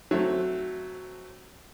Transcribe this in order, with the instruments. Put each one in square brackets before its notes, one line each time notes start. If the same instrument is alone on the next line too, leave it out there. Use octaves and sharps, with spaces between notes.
[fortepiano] F#3 A3 C4